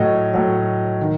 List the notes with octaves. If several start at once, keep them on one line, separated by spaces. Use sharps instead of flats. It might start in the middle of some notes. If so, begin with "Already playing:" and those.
Already playing: A2 F#3 C#5 D#5
A2 F#3
D#3